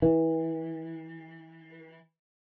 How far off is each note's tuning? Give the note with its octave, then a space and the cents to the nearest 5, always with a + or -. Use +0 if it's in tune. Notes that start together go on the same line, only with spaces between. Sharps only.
E3 -25